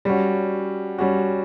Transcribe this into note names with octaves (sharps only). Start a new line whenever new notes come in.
G3 C#4 F#4
G3 C#4 F#4